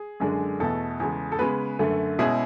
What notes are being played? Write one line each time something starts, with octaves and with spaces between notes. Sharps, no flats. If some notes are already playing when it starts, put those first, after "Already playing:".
Already playing: G#4
F#2 D3 G#3 D4
E2 B2 A3 A4
E2 C#3 G#3
A4
C#3 G#3 B3 B4
F#2 D3 A3
B2 G#3 C#4 E4 G#4